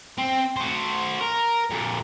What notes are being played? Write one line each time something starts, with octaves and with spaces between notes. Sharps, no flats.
C4
F#4 C5
A#4
F2 A#2